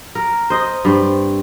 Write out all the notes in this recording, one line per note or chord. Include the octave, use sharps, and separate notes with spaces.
A#4
C5 D#5
G2 C4